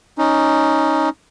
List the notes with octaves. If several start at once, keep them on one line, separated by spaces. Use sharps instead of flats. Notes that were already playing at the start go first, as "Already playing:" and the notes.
C#4 D#4